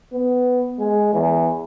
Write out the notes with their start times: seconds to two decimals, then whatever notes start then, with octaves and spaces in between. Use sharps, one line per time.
0.12 B3
0.79 G#3
1.13 E2